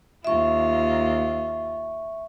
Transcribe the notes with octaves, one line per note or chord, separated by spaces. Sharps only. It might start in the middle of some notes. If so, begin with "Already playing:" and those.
D#2 F4 E5 C#6